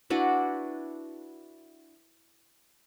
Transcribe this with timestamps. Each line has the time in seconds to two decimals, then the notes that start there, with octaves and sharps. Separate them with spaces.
0.10 D4 E4 F#4 B4